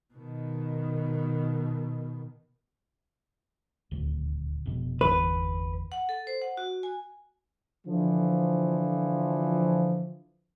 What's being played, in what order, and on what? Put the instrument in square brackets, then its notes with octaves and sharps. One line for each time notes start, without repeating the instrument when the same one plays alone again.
[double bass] B2 D#3
[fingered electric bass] D#1 D2
F1 B2
[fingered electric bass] G1 E2 E3 [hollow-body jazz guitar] B4
[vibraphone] F#5
A4
C5
F#5
F#4
G#5
[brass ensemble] D3 E3 F3